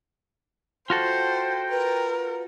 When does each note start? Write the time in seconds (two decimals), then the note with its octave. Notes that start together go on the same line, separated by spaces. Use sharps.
0.90 F4 F#4 A4 C5 G5
1.70 A#4 B4